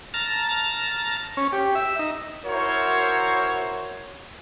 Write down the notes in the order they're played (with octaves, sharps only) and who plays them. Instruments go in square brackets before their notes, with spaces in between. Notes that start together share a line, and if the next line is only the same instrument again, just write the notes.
[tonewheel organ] A5 A#5 F6
[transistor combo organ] C#4
G4
E5
D#4
[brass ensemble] E4 F#4 A#4 C5 C#5